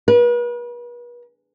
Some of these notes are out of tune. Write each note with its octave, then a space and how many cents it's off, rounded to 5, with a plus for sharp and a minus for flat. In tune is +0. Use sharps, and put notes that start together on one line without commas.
B4 -40